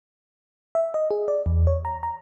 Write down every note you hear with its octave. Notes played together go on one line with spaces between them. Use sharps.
E5
D#5
G#4
D5
E2
C#5
A#5
A#5